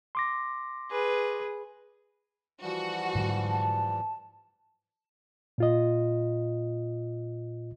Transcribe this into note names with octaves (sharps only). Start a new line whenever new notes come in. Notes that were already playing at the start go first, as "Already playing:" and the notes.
C6 D6 A#6
G#4 B4
E3 F3 G3 F#4
G#2 D3 F#3
A5
A#2 F4 D#5